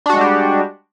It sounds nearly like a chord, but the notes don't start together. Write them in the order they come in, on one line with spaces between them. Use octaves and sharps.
D4 F#4 G#3 G3 G4